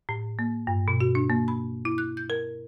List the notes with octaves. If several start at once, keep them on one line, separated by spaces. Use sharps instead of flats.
A2
A#3
G2
B2
F#4
D4
A#3
B5
E4
F#6
G6
A#4